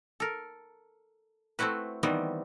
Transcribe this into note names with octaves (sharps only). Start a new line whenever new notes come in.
A4 A#4
A3 C4 E4 F#4 B4
D#3 E3 G3 B3 C4